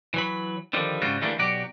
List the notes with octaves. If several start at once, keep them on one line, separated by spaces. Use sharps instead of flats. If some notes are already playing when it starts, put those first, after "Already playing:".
E3 F#3 B5
D3 D#3 F3 G3
G#2 C#3 G3 F4 F#4
D3 E3 G3 A3 A#3 D4
B1 F#3 F#4 G4 D5